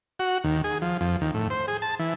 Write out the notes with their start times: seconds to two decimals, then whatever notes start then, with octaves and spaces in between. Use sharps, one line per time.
0.19 F#4
0.44 D#2
0.64 G#4
0.82 F3
1.01 F2
1.21 D#2
1.34 A2
1.50 C5
1.68 G#4
1.82 A5
1.99 E3